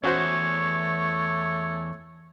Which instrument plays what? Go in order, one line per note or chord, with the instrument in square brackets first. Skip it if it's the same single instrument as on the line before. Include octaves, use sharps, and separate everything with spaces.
[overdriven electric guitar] E2 [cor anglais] A3 [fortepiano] C#4 F#4 C5 [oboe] C#5